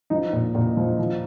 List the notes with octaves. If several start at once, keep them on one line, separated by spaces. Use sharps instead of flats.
F3 D#4
A#2
A#2
F3
F3